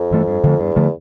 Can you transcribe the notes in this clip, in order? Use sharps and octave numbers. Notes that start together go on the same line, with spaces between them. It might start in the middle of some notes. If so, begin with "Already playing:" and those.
Already playing: F2
G2 E3 A3
G2
D3 F3 A3
E2 G2
D3 F3 A3